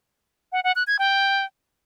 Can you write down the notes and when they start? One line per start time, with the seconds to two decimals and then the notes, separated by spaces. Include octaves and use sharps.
0.52 F#5
0.64 F#5
0.76 F#6
0.87 G#6
0.99 G5